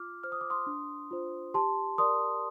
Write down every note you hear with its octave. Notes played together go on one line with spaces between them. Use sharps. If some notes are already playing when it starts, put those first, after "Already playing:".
Already playing: F4 D6 F6
C5 F6
D#6
D6
C6 D#6
D4
F4 C5
G4 A5 C6
A#4 D5 C6 D#6